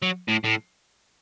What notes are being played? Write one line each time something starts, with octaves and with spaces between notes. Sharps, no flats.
F#3
A2
A2